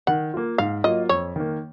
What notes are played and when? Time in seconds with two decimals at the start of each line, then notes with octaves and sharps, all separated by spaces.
0.07 D#3 F#5
0.34 A#3 F4
0.58 G#2 F5
0.84 F#3 A#3 F4 D#5
1.09 F2 C#5
1.36 D#3 A#3